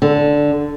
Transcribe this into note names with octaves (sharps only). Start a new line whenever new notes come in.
D3